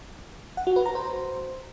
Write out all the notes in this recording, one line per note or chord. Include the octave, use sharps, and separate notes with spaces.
F#5
F#4
B4
A#5
C5